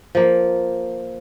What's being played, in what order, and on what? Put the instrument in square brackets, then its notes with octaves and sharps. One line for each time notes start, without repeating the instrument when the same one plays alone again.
[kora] F3 A#3